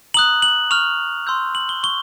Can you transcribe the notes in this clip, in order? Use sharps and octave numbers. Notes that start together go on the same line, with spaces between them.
A#5 D#6 F#6 F#7
F#7
C#6 F6 F7
C6 E6 G6
F#7
G7
C#6 G7